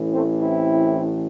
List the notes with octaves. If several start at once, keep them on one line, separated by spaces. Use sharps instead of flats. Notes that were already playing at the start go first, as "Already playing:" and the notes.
Already playing: A1 A2 E3
A3 C4
C4 E4